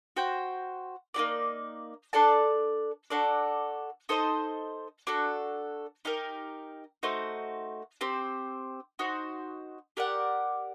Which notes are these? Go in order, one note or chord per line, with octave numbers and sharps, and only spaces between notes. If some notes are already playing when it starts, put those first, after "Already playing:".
F#4 C5 G5
A#3 D#4 G4 D5
D4 A4 D5 A5
D4 F#4 A4 D5
D#4 A4 C5 D#5
D4 F#4 A4
D#4 G4 A#4
A3 D#4 F#4 C5
C4 G4 C5
D#4 F#4 C5
G4 A#4 D5 F#5